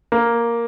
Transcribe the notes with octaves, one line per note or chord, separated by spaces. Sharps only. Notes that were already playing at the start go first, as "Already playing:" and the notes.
A#3